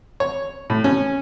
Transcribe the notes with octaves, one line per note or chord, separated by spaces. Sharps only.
C#5
A2
C#4